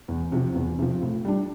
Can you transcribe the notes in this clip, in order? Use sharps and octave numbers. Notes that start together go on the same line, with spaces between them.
E2
C3 F3
E2
C3 F3
A2
G3 D4